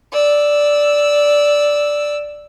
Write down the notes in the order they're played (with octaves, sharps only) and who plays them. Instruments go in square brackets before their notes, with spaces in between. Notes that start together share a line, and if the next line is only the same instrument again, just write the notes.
[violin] D5 E6